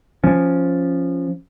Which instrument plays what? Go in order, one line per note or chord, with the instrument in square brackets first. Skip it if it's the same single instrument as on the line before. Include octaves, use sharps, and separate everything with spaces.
[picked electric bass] F3 C#4